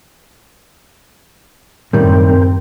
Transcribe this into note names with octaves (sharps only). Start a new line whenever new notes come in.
F#2 A2 D#3 G3 C4 A#4 G5